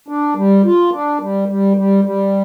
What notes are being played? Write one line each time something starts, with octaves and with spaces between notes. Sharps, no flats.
D4
G3
F4
D4
G3
G3
G3
G3